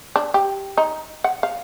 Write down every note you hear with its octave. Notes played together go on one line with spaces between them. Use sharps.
D4
G4
D#4
F#5
F5